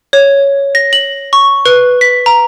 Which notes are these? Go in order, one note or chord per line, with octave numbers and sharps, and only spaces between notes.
C#5
A#6
F#7
C#6
B4
B6
A#5